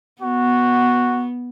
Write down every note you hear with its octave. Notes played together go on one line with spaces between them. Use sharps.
B3 F#4